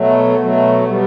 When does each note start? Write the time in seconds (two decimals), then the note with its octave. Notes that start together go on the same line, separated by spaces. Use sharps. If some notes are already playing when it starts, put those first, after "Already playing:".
Already playing: B2 F#3 A3
0.37 B2 F#3 A3
0.84 B2 G3 B3